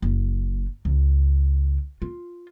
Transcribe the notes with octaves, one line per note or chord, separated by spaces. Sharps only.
F#1
C#2
F4